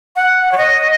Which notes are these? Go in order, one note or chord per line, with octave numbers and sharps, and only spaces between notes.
F#5
C#5
D#5